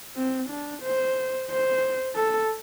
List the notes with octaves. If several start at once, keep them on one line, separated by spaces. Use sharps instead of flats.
C4
D4
C5
C5
A4